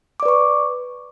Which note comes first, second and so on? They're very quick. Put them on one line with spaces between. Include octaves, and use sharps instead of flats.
D6 D5 B4 C#6